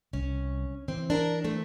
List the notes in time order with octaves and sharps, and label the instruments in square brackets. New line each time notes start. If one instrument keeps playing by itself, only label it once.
[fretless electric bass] C2 [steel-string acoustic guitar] C#4
[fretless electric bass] E3 [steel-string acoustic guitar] C4
[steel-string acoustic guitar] D4 A#4
D2 A3 C4